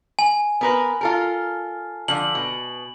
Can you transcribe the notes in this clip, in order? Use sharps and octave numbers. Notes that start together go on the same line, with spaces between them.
G#5
B3 A#4 B4
F4 A4 A#4
D3 F3 F#7
B2